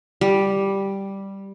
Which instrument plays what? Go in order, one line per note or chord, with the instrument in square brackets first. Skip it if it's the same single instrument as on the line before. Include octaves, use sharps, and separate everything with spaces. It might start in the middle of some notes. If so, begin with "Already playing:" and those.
[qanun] G3